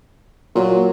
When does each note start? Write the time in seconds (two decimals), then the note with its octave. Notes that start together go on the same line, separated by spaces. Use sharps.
0.55 A#2 F#3